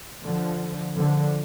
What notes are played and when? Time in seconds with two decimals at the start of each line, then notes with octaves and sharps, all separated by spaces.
0.24 D3 F3
0.96 D3 F3